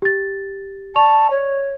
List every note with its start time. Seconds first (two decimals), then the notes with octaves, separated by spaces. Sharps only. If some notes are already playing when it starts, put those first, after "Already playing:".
0.02 G4 A6
0.96 D5 A5 C#6 F7
1.31 C#5